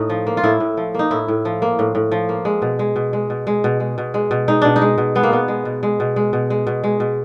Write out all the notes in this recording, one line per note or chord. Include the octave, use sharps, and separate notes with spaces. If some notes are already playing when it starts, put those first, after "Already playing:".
Already playing: A2 D#4
F3
A#3
F4
A2 E4
A2
F3
A#3 D#4
A2 E4
A2
F3
A#3
A2
A2
F3
A#3
G#3
B2
G#3
B2
G#3
B2
G#3
B2
G#3
B2
G#3
B2
G#3 D#4
B2 D4
D#4
G#3
B2
G#3 B3
A#3
B2 B3
G#3
B2
G#3
B2
G#3
B2
G#3
B2
G#3
B2